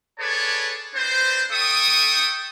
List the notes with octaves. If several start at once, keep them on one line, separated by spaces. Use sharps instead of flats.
G#4 A4 B4 C#5 D5 A5
C4 D4 B4 C5
A4 E5 G5 C#6 D#6